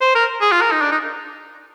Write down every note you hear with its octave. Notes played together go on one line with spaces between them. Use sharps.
C5
A#4
G#4
F4
A#4
D#4
D4
D#4